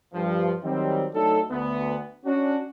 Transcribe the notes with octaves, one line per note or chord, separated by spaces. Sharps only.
G2 F3
D#3 F#3 G3 C4
F#3 A3 D4 D#4 A4
D2 B3
C#4 D4 F#4